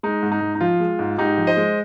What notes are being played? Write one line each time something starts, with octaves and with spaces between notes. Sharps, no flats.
G#3 D#4
G#2
D#4
G#2
D#4
F3 F4
G#3
G#2
G#2 D#4 G4
F3
C5 D#5
G#3